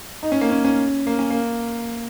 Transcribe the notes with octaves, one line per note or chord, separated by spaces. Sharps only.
D#4
C#4
A#3
C#4
C#4
A#3
C#4
A#3